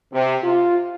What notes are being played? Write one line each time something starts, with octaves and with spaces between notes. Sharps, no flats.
C3
F4